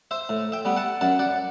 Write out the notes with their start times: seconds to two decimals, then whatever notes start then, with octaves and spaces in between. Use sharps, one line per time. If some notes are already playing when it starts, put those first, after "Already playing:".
0.11 C5 E5
0.29 A2
0.52 E5 G5
0.65 G3 B3
0.77 F#5 A5
1.01 F#2 F#5 A5
1.19 D5 F#5